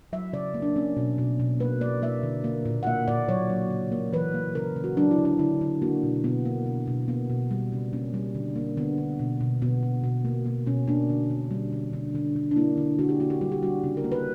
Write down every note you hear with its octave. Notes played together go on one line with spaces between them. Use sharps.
F#3 E5
C#3 D5
A#3
D4
A#3 C#4
B2
B2
B2
A#3 B4
A#3 D5
A#3 E5
D3
A#3
A#2
F#5
A#3 E5
A#2 D5
F#3 C#5
F#3
C#3
A#3
E3 B4
A#3
C#3 A#4
C#3
F#4
F#3 D4
E4
D3
D4
D3 E4
D3
A#3 F#4
B2
B2 B3
A#3
B2
B2
A#3 B3
B2
G3
C#3
A#3 C#4
G3
D3
A#3
D3 B3
D3
B2
B2
B2 B3
B2
B2
A#3
B2 A#3
B2 C#4
A#3 D4
D3
D3
G3
D3
D3
D3
D3
D4
A#3 E4
D3
D3 F#4
G4
A#3 F#4
G4
G3 F#4
G4
G3 F#4
C#3
A#4
A#3
B4